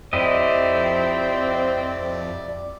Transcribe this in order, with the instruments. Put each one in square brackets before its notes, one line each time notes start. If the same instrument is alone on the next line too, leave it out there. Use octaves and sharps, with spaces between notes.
[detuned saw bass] F2 [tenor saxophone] C4 [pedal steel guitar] E4 G4 D#5 [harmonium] D5